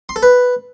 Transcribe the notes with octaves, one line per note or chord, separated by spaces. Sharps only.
C6
A4
B4